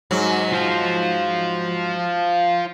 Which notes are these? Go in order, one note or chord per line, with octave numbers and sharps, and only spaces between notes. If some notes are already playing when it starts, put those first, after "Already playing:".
G#2 F#3
F4 C5